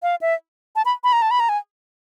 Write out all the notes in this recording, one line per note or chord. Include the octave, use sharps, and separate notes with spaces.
F5
E5
A5
B5
B5
A#5
A5
B5
A#5
G#5